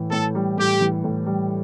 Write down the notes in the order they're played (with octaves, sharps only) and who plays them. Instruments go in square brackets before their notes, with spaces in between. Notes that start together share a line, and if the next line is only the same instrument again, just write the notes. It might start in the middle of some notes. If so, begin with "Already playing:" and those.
Already playing: [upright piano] A2 E3
[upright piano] A2 [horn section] A4
[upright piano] G3
[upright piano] A2 [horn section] G4
[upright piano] E3
A2
G3